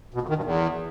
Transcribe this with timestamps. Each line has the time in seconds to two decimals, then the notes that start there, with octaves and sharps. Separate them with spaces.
0.14 B2
0.22 F2
0.29 D#3
0.36 G2
0.44 E2